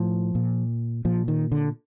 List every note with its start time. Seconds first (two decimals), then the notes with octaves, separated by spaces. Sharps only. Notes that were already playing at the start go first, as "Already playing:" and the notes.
Already playing: A2 F3
0.35 A#2
1.05 A#2 F3
1.28 D#3
1.52 D3